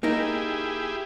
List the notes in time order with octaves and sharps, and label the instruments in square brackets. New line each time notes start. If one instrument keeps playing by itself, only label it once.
[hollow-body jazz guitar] A#3 D#4 A#4 [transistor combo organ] E4 G4 G#4